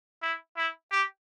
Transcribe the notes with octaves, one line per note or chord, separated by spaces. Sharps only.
E4
E4
G4